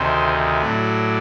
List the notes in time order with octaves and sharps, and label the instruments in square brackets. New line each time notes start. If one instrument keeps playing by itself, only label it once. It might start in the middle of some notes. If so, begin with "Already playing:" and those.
Already playing: [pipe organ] D2 C3 D#3 C5
A2 F#3 D5